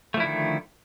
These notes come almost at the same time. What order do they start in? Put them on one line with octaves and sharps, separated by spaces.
A3 F3 E4 D3 D#3